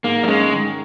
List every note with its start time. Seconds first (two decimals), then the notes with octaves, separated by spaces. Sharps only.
0.04 G#2 A#3
0.23 F#3
0.27 G#3 C#4
0.51 D#3